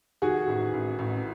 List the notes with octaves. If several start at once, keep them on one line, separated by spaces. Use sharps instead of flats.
D#3 F#4 G#4
A1
A1
A1